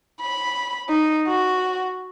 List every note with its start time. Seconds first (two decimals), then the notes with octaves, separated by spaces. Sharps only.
0.21 B5
0.90 D#4
1.28 F#4